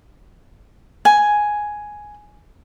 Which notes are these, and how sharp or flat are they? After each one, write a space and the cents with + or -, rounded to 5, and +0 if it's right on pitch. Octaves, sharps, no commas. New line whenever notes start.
G#5 +5